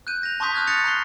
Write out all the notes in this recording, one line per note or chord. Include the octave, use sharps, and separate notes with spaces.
F#6 G6 D#7
A#6 F7
A5 C6 C#6 D#6 G6 B6
D#6 F6 F#6 G#6
F6 F#6 A6 A#6 C#7 F7
A#5 F#6 C7 G7